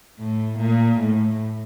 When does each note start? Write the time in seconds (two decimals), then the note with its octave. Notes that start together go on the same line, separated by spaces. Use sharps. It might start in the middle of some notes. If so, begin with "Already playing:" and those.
0.19 A2
0.59 A#2
1.00 A2